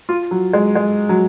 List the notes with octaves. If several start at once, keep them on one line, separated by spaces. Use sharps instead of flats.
F4
F#3
G#3
G#3
F#3